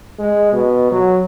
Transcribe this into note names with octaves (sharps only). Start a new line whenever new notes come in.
G#3
B2
F#3